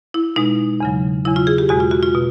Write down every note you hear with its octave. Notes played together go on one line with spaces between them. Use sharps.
E4
B2 G#3 D#4
E2 C#3 F#3
E2 C#3 F#3 E4
F4
G#4
G4
E2 B2 G#3 F#4
F4
F#4
F4
B2